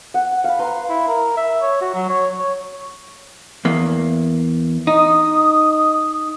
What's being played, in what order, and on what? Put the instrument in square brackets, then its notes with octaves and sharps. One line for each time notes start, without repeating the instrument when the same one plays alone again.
[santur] F#5
F5 B5
B4 F5 A#5 C6
[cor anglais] E4
A#4
E5
C#5
F#4
F#3
C#5
C#5
[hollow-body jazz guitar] E2 A#3
[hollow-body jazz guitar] D#4 [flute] D#6